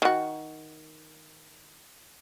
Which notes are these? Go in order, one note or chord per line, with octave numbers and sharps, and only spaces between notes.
D#3 F#4